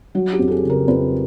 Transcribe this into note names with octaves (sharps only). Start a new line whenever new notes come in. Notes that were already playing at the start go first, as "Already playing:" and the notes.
F#3 F#4
G4
F2
A4
G#4
C#3
A#4
F2 B4